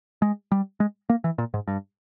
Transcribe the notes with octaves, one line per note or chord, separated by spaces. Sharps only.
G#3
G3
G#3
A#3
E3
A#2
G#2
G2